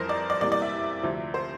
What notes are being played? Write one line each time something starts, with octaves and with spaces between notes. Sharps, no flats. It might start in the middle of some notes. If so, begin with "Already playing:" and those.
Already playing: F2 E3 G3 A#4 C5
D5
D5
E2 C3 G3 A#3 D5
D5
E5
D2 C3 F3 C4
C5